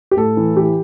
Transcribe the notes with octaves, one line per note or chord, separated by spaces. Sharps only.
G4
A2 A4
E3
E3 G4